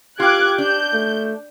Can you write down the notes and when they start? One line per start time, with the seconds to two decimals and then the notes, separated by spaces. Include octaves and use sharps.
0.20 F4 G4 G5 D6 F#6 G#6
0.58 D4 G6
0.94 A3